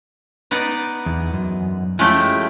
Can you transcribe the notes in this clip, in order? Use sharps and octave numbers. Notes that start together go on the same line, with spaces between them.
B3 D#4 D5
E2
F#2
F3 G#3 A3 C#4 E4 G4